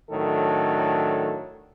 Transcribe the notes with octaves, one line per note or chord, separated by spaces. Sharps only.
A2 D#3 F#3 D4 A4